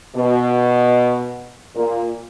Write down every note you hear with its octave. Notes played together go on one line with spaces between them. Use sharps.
B2
A#2